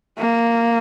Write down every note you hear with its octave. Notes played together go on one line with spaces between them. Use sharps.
A#3